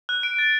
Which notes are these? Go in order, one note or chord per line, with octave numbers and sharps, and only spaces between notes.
F#6
D7
A6